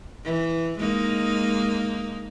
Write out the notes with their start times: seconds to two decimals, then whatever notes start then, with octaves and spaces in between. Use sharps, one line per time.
0.24 E3
0.79 G#3 A#3 D#4